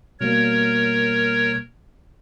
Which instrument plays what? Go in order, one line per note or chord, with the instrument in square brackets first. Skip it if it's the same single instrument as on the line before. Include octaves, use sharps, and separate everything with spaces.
[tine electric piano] B2 G3 A#3 [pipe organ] A#4 C#5